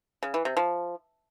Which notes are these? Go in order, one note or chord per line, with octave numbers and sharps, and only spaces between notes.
C#3
E3
C3
F3